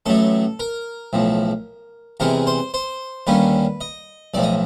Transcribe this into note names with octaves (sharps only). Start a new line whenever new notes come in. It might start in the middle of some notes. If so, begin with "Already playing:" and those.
A1 A2 F#3 A3 A4
A#4
B1 A2 F3
E2 C3 E3 G#3 A#4
C5
C5
D#2 D3 G3 A#3 C#4 B4
D#5
B1 A2 F3 D5
D#5